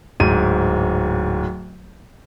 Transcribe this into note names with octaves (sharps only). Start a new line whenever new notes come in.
D1 G#2 D#7